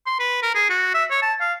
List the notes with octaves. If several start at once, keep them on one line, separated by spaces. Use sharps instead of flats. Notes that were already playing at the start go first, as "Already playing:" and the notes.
C6
B4
A#4
G#4
F#4
E5
C#5
A5
F5